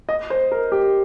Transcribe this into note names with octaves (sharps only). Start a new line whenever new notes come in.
D#5
C5
A#4
G4